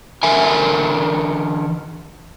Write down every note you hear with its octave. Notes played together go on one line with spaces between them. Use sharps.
D3 E3 A#4 E5 G#5